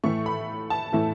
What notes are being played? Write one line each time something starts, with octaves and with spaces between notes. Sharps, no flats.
A2 E3 A3 E4 C#6
B5
A5
A2 E3 A3 E4